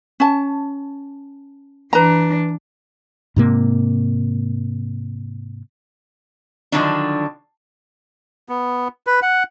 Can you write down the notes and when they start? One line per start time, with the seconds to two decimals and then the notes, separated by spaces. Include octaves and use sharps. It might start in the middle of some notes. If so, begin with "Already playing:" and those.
0.20 C#4 A5
1.93 E3 D4 B4 A#5
3.36 G#2 C3 A#3
6.72 D3 D#3 F3 F#3 D4
8.49 B3
9.07 B4
9.22 F#5